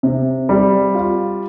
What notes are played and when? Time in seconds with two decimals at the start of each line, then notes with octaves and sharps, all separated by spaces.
0.03 C3
0.49 G3
0.95 F4